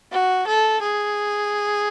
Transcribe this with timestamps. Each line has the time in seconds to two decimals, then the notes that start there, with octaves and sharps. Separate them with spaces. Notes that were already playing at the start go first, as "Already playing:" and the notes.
0.12 F#4
0.47 A4
0.82 G#4